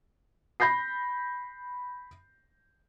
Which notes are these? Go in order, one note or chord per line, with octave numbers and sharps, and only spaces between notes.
B5 G6 A#6 C7